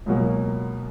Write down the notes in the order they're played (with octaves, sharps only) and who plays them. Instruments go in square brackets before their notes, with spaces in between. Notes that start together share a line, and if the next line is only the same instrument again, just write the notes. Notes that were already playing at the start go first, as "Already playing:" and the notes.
[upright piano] C#2 B2 F#3 A#3